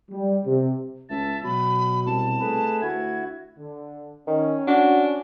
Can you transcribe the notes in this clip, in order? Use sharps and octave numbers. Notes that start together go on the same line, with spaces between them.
G3
C3
C#2 E5 A5
B2 F#3 B5
C2 A5
A3 G#4 B4
D2 E4 F#4 G#6
D3
D#3 C#4
D4 F#4